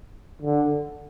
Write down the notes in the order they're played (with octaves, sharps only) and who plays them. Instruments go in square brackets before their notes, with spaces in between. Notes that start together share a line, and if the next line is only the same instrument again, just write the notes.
[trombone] D3